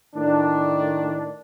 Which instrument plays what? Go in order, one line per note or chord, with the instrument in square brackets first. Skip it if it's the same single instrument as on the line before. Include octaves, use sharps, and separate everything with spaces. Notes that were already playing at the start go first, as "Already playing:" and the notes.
[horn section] A2 D#3 D4